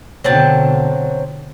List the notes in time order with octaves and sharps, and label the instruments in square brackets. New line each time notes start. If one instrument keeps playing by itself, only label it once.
[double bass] B2 D3 [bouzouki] F#3 C4 A5